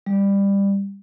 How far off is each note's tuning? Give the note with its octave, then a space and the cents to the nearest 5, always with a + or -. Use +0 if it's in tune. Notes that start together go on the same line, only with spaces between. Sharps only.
G3 +20